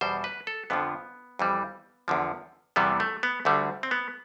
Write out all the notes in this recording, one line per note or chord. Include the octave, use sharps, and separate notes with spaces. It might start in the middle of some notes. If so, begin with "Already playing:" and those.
E2 B2 G3 C5
B4
A4
F2 D3 F3 B3
F2 E3 G3
E2 D3 F3
E2 C3 E3 G3 B3
A3
B3
D2 D3 G3 A3
C4
B3